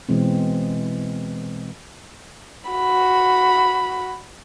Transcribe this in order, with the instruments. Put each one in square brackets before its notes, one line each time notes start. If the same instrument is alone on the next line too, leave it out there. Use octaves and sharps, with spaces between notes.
[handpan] B2 E3 G#3 C4
[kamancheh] F#4 B5